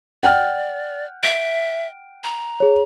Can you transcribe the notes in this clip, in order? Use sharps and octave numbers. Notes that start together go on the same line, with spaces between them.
D5 F#5 G5 F6
E5 D7
A#5
G#4 C#5